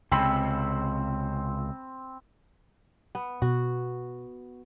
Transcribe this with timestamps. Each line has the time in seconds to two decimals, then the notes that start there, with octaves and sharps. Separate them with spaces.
0.12 C#2 C3 C4 B5
3.15 B3
3.42 B2 F#4